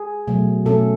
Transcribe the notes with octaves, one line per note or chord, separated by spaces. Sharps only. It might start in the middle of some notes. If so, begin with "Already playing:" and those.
Already playing: G#4
B2 F#3 A3
B2 A3 C#4 A4